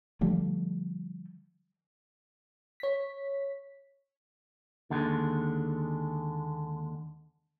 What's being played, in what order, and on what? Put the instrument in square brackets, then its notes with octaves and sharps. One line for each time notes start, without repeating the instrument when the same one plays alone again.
[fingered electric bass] D3 F3 G3 A3
[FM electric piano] C#5 B6
[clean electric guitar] D#2 D3 G#3